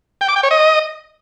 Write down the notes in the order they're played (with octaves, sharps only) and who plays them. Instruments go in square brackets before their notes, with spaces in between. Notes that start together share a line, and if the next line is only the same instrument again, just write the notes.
[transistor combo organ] G5
D6
G5
C#5
D#5